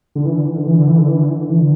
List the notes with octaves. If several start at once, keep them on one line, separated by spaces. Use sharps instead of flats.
D3
E3
D3
E3
D3
E3
D3
E3
D3
E3
D3
E3
D3
E3
D3